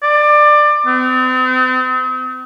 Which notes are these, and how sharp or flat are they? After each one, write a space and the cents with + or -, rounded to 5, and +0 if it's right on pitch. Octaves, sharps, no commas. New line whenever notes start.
D5 +20
C4 -40